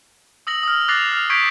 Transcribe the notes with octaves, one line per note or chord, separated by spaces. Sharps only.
D#6 E6 A#6 F#7
D#6 F6
D6 F#6 A6 A#6 C7 F7
F6
C#6 G6 G#6 B6 C7 D7